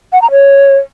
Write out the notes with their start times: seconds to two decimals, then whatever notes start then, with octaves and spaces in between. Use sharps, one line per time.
0.13 F#5
0.22 A#5
0.31 C#5